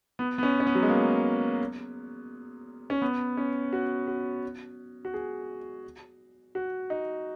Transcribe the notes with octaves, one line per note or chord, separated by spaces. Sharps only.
B3
B3
C#4
C#4
B3
F#3
G#3
A#3
C#4
B3
C#4
F#4
F#4
F#4
G#4
F#4
D#4